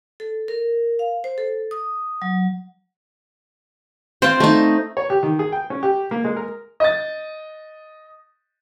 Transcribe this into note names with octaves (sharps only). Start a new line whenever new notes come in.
A4
A#4
F5
C5
A4
D#6
F#3
C4 F4 C5
A3 D#4
C#5
G4
D#3
G#4
G5
C#4
G4
A#3
G#3
A#4
D#5 A6